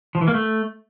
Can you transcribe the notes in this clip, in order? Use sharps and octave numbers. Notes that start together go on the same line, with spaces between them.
F3
E3
A#3
A3